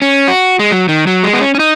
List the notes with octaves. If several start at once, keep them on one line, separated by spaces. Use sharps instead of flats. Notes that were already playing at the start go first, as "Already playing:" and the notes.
C#4
F#4
G#3
F#3
D#3
F#3
G#3
B3
C#4
C#4
D#4